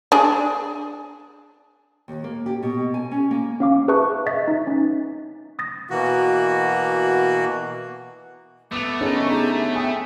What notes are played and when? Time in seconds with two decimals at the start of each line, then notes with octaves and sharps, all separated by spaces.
0.12 D4 G#4
2.08 D#2
2.24 A#3
2.46 G4
2.63 B2
2.94 G#5
3.11 C#4
3.31 A#3
3.60 C#4 F5 D6
3.88 G#4 B4 E5 A5 C#6 F#6
4.26 D#5 E5 A6 B6
4.48 D#4
4.67 C#4
5.59 D#6 A6 A#6
5.90 B2 E3 A#3 F#4
8.72 A3 B3 D6 E6 F7
9.01 D3 C#4 D#4 G#4 A#4 E5
9.15 C#6
9.29 G4 G#4 A#5
9.54 E5
9.76 G5 G#5 D#6